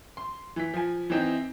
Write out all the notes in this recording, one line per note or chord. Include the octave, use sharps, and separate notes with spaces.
C6
E3 B6
F3 G#5
E3 C4 D#4